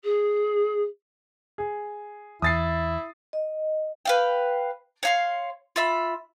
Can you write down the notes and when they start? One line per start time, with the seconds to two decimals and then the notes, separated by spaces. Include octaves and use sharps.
0.04 G#4
1.58 G#4
2.42 E2 E4 D#6 A6 C7
3.33 D#5
4.05 B4 F5 G5
5.03 C#5 F5 C6
5.76 F4 E5 B5